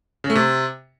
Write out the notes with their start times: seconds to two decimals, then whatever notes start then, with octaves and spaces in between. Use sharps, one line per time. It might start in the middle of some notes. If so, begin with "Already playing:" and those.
0.24 C#3
0.30 A3
0.35 C3